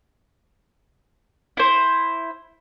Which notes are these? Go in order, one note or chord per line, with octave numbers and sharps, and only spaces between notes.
E4 C5